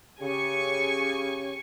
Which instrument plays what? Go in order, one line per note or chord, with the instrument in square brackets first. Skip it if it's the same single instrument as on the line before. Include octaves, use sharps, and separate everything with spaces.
[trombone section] C#3 G4 [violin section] G#5 C#6